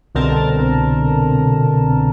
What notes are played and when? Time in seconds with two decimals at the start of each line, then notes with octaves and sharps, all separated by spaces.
0.15 C2 B2 D3 C4 A#4 A5